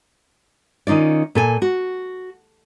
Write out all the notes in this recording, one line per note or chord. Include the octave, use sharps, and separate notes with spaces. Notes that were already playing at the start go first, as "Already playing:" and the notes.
D#3 C#4 D#4 F4 D5
A#2 A4 G#5
F#4